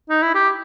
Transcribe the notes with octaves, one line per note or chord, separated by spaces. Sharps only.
D#4
E4
G4